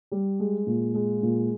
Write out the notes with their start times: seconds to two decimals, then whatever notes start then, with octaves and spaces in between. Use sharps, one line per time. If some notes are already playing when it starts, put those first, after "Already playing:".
0.12 G3
0.40 G#3
0.67 A#2
0.94 G#3
1.23 A#2